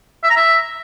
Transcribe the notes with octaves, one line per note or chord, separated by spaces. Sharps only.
E5
A#5
E5